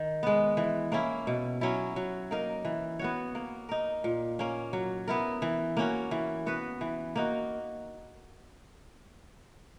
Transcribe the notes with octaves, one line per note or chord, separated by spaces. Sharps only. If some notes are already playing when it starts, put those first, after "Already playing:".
Already playing: D#3
G#3 B3
E3
A#3 C#4 E4
B2
F#3 C#4 E4
F#3
A#3 D#4 A#4
E3
B3 F#4 C#5
A#3
D#4 A#4
A#2
A#3 C#4
F#3
B3 E4 A#4
E3
A#3 C#4 F#4
E3
B3 F#4 B4
E3
A#3 D#4 F#4